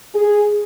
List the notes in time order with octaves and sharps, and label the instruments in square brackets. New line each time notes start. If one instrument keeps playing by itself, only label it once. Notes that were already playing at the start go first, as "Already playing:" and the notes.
[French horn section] G#4